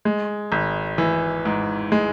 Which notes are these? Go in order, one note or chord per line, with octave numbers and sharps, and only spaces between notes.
G#3
G#1
E3
G#2
G#3